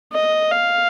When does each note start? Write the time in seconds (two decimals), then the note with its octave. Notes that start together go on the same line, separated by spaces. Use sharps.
0.13 D#5
0.51 F5